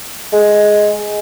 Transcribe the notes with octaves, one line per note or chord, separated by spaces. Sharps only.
G#3